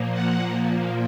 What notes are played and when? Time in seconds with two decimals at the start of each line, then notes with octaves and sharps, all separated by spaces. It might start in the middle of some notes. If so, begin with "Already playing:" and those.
Already playing: A#2 F3 A#3
0.12 F#5